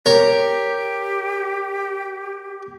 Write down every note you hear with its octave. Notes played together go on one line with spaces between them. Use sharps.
G4 A#4 C#5